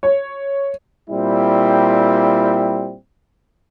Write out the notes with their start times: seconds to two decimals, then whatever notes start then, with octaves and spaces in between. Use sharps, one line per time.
0.03 C#5
1.10 A#2 G3 C4 E4